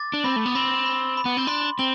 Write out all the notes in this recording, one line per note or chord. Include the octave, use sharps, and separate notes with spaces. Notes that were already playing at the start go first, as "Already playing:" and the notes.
Already playing: D6 A6
D4
C4 B5
A3
B3
C4 B5
B5
B5
B3
C4
D4 C6
C4 F#7